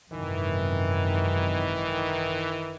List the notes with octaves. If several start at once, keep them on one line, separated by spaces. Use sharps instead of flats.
G#1 F#2 C3 D#3 E3